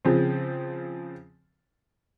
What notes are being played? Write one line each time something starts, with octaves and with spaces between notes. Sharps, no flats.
C#3 F3 C4